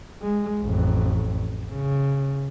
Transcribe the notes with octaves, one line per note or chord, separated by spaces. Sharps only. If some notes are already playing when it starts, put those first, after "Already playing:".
G#3
A1 F2
C#3